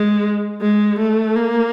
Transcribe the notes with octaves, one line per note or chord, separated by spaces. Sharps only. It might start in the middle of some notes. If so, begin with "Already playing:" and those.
Already playing: G#3
G#3
A3
A#3